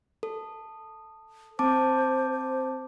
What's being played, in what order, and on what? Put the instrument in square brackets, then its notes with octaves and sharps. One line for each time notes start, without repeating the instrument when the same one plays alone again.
[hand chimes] A4
[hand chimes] C4 A5 D6 [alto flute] C5
[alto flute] C5